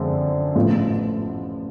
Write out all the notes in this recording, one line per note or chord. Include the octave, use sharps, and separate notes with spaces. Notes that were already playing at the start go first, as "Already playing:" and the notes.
Already playing: F#2 D3 F3 G#3 C4
A1 A2 F3 A3